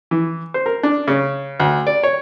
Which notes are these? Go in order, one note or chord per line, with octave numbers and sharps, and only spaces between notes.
E3
C5
A#4
D4
C#3
D2
D5
C#5